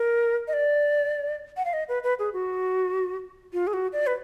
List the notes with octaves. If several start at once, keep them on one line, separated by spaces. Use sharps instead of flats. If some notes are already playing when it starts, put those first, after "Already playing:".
Already playing: A#4
D#5
D5
F#5
F5
D#5
B4
B4
G#4
F#4
F4
G#4
F#4
D5
B4